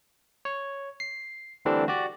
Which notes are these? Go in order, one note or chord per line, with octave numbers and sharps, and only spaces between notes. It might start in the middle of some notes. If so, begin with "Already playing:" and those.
C#5
C7
D3 E3 G3 A3 C4 D4
F#4 G4 D5